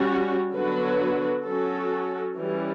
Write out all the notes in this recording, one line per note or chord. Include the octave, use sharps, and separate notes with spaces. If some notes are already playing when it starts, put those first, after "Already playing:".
Already playing: G3 C#4 F#4
D3 F#3 B3 F#4 B4
F#3 C#4 F#4 A4
E3 G3 C#4